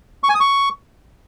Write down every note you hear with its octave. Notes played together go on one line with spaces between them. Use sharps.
C#6
G#5
D#6
C#6